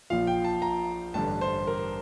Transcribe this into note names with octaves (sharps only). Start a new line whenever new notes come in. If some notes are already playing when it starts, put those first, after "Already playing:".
A#1 A#2 F3 F5
G5
A5
A#5
A1 G2 D3 A5
C5
A#4